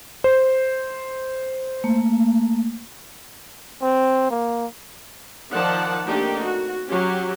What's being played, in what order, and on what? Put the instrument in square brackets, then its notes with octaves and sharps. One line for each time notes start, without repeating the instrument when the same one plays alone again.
[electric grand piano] C5
[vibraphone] A3 A#3
[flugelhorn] C4
A#3
[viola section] D#3 F3 D5 F#5 A5
A3 A#3 C4 D4 D#4 G4
F#4
F#3 C#4 G4